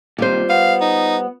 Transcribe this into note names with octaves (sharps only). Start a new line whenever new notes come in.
D#2 C3 G3 F4 C5
B3 F5
D#4